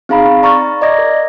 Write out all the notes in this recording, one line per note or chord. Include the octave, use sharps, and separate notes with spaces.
C4 D#4 G#4 F5 A#5 B5
C4
D5 A#5 C#6 F6 A6
D5 D#5 D6 G#6 A#6
A#4